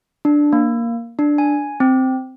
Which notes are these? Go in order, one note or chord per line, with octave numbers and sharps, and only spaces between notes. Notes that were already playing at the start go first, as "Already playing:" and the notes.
D4
A#3
D4
G#5
C4